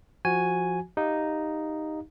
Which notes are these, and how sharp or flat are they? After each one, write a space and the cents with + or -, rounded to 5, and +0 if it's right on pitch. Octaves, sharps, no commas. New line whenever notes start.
F3 +0 F#4 +0 G#5 +0
D#4 +0 G4 +0 F5 +0